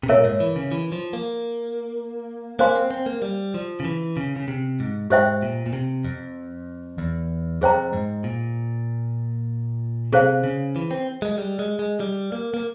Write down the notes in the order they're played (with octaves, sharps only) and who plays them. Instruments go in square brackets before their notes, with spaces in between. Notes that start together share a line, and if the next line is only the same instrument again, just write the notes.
[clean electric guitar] C3
[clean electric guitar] A#2 [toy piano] A#4 C#5 E5
[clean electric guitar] G#2
E3
C#3
E3
F3
A#3
[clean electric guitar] A#3 [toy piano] C5 F5 G#5 C6
[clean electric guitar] C4
C4
A#3
G3
F3
C#3
E3
C#3
C#3
C3
G#2
[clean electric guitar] G#2 [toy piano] G4 C5 E5 G5
[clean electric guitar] A#2
A#2
C3
F2
E2
[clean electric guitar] F2 [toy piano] G#4 C5 G5 A#5
[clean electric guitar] G#2
A#2
[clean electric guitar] C3 [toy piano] G#4 C5 F5
[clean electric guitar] C#3
E3
C4
G#3
G3
G#3
G#3
G3
A#3
A#3